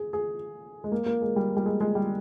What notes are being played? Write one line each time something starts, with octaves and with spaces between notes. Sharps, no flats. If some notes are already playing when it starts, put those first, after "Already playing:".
Already playing: G#4
G#4
G#3
A#3
A#3
G#3
G3
G3
G#3
G#3
G3